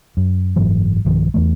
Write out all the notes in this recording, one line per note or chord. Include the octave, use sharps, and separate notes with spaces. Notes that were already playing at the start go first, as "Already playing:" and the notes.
F#2
F#1 G#2 E3 F#3
B1 G2 D#3 F3
E2 E3 A3